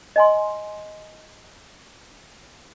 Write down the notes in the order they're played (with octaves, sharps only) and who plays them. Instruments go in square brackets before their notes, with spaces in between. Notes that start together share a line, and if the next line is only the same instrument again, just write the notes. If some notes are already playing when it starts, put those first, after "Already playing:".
[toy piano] D#5 G#5 C6